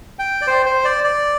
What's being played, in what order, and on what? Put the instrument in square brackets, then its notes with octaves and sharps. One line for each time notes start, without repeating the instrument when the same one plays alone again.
[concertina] G5
D5
C5
C5
D5
D5